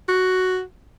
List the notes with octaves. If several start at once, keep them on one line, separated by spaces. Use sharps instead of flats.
F#4